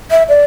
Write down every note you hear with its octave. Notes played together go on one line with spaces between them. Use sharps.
E5
D5